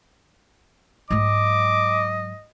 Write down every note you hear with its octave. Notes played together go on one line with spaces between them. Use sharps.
G#2 F#3 D#5 D6